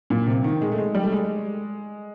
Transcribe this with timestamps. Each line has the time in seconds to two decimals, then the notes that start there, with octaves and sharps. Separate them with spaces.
0.10 A#2
0.27 C3
0.44 D#3
0.62 G#3
0.72 A3
0.78 G#3
0.95 G3
1.04 A3
1.12 G#3